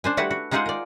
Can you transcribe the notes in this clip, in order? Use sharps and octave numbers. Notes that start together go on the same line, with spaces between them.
D4 C5 G#5
G3 A3 E4 F#4 B4 F#5
F#4
G#3 D#4 F4 G#4 C5 F#5
A#4 D5